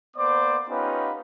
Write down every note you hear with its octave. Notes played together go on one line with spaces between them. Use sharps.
A#3 B3 C5 D5 D6
B3 C#4 D#4 F4 G4 B4